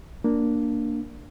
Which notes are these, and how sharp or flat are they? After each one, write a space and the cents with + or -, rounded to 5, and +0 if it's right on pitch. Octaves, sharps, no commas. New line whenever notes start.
A#3 +0 D4 +0